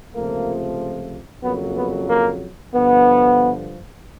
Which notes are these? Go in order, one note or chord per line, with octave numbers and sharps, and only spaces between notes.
C#2 C3 F3 A3 A#3
F2 C#3 F#3 A#3 B3
B3
A#3
G2 D3 F3 B3